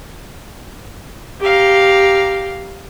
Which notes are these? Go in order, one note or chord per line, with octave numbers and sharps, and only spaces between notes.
G4 F5 A#5